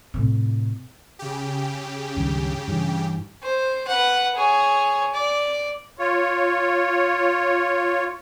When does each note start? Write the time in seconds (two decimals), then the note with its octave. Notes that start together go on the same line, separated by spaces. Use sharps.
0.14 A2 C3
1.19 C#3 G4
2.16 C#2 G2 D#3
2.68 G2 E3
3.42 C5
3.87 B4 F#5
4.35 G#4 C#5
5.14 D5
5.99 F4 C#5